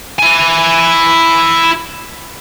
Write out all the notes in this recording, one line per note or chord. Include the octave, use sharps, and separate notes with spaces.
E4 G#5